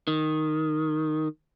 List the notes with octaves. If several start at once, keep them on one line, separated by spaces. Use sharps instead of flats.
D#3